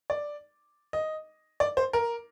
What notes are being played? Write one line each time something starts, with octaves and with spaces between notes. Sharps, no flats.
D5
D#5
D5
C5
A#4